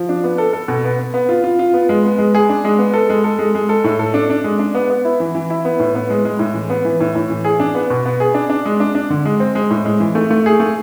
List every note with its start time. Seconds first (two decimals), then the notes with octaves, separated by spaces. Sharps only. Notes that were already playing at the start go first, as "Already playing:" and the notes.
Already playing: F3
0.09 D4
0.24 B3
0.38 A4
0.53 A4
0.68 B2
0.84 B3
0.99 B3
1.14 B3
1.29 F4
1.44 F4
1.59 F4
1.74 B3
1.89 G#3
2.05 B3
2.18 G#3
2.35 G#4
2.49 D4
2.65 G#3
2.79 B3
2.94 A4
3.10 G#3
3.24 A4
3.39 G#3
3.55 G#3
3.69 A4
3.84 A2
3.99 A4
4.14 D4
4.30 D4
4.44 G#3
4.59 D4
4.75 B3
4.90 B3
5.05 E4
5.20 E3
5.35 E3
5.50 E4
5.65 B3
5.80 A2
5.95 B3
6.10 G#3
6.25 G#3
6.39 A2
6.54 E3
6.70 B3
6.85 E3
7.00 A2
7.15 A2
7.30 E3
7.45 G#4
7.60 D4
7.75 B3
7.90 B2
8.06 B3
8.20 G#4
8.34 D4
8.50 D4
8.65 G#3
8.80 D4
8.95 D4
9.10 D3
9.25 G#3
9.40 C4
9.55 G#3
9.70 A2
9.85 G#3
10.00 E3
10.15 A3
10.31 A3
10.46 G#4
10.60 A3